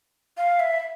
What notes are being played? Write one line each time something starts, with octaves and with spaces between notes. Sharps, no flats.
F5
E5